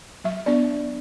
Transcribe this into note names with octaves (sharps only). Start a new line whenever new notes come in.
F#3 E5
B3 D4 D5